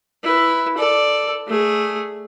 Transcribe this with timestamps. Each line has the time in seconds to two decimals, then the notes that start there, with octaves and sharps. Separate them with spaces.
0.24 E4 B4
0.77 A4 D5
1.47 A3 G#4